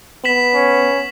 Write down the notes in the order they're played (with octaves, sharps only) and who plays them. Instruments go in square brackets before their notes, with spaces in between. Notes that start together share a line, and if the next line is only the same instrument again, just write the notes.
[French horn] B3 [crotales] B6 E7 F#7
[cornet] C#4